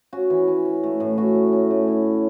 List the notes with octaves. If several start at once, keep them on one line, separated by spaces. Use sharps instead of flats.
C#4 F#4
E3
C#4
C#4
A3
A2
C#4 F#4
C#4
C#4
A3
E4
C#4